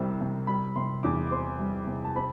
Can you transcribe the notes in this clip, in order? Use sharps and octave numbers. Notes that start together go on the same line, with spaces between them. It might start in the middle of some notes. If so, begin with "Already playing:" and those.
Already playing: C2 C3 G3 C4
C3
G3 B5
C3 C6
E2 D6
D6
C4 C6
G3
C3
A5
C4 B5